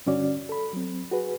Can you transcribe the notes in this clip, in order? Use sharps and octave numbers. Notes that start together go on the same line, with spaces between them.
G2 D3 C#4 F#4 D5
A4 B5
F#3 C4
F#4 G#4 B4